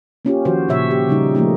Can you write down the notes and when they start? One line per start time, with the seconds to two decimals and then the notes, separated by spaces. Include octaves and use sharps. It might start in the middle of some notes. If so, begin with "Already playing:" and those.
0.25 A#3 C#4 F4 G4
0.45 D#3 F3 F#4 C5
0.68 A#2 C#3 C#5 E5
0.91 G4
1.09 C#3 G3 D#4
1.35 F3 A3 A#3 D#4